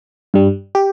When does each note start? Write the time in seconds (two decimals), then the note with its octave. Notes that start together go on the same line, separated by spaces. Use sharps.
0.34 G2 G3
0.75 G4